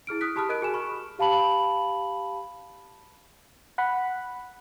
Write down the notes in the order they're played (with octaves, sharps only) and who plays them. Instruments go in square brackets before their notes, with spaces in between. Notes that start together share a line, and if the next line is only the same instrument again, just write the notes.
[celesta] E4 G#4 F6 D7
D#6 F6 F#6 B6
G4 A5 B5 D#6 F6
A#4 D#5 F#6 D7
F#4 G#4 G#5 E7
B5 C#6 F6
G4 F5 A5 B5 F#7
[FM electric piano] F#5 B5